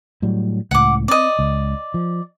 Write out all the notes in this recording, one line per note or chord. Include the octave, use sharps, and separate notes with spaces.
A2 F#3 G3
C#2 A2 F#5 D6
C4 D5 D#5
C#2
F3